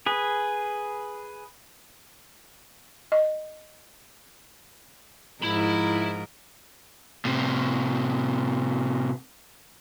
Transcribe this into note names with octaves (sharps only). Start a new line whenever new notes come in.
G#4 B4
D#5
G#2 F3 E4 A#4 B5
A2 C3